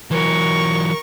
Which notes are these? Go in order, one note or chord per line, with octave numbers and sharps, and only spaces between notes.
E3 F#3 A#4 C#6